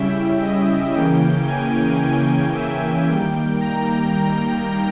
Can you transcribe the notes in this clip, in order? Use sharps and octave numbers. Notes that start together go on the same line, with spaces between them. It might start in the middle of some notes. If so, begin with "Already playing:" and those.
Already playing: C#3 G3 C#4 E4 E5 G5
D#5
C#3 E3 A#3 C#4 G5
G#5
G#5
E5
D#3 G3 A#3 G5
A#5